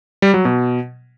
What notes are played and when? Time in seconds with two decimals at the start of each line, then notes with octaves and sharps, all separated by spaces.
0.22 G3
0.34 F#3
0.45 B2